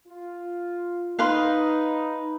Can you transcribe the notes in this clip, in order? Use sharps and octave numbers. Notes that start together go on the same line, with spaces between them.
F4
D#4 B4 F5 C6